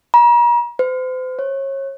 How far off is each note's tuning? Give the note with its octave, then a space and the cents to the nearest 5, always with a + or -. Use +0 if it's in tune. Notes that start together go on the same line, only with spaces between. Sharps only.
A#5 +40
C5 -40
C#5 -30